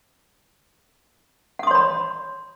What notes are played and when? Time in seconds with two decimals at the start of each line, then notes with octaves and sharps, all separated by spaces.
1.59 F#5
1.63 D#6
1.67 C6
1.71 C#5
1.75 B5